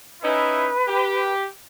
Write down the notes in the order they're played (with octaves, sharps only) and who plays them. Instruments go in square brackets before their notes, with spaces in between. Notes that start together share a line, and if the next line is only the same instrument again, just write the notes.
[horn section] C#4 D#4 E4 [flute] B4
[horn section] G4